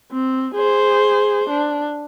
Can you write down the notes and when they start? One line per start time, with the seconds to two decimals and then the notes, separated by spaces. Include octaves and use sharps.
0.12 C4
0.55 G#4 C5
1.49 D4